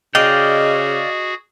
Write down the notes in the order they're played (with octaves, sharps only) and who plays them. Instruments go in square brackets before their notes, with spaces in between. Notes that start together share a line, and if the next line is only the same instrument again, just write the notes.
[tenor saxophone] C#3 [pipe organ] F#4 G#4 [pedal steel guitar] D5 F5 G5 [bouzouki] D#5